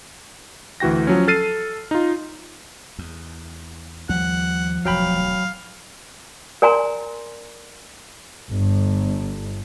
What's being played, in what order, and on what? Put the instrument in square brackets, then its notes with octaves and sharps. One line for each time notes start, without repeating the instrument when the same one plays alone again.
[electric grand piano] D2 E3 F#4 G5 A#6
F3 F#3 C#4
A4 F6 A6 C7 D#7
D#4 F4
[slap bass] E2
[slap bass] D#2 G3 [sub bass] F3 [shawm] F#5
[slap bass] E1 D2 [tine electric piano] F#3 G5 B5 [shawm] F5
[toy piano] A#4 D5 G#5 A#5 C6
[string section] G1